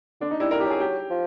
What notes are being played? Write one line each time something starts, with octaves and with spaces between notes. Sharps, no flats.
D3 D4
D#4
G3 E4
G3 A#4
G4
F#3 G#4
G4
F3